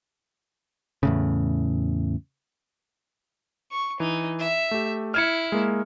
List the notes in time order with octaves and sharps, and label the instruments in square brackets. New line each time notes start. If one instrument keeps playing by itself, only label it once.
[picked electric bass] E2 A2 C#3
[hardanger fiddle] C#6
[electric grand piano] E3 [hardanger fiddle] D#4
[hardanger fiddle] E5
[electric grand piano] A3 G4
[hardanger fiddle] E4 [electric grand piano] F6 G#6 C#7
[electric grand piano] G#3 A#3